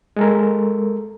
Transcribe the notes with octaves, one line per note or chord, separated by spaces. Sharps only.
G#3 A4 A#4